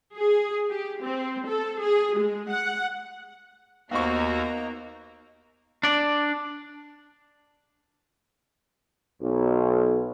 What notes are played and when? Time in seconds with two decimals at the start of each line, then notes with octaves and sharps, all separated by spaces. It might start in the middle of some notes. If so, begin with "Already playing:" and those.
0.16 G#4
0.70 G4
1.02 C4
1.47 A4
1.81 G#4
2.18 G#3
2.50 F#5
3.91 D#2 A#3 B3 D#4 F#4 C5 A#5 C#6
5.83 D4 D5
9.22 B1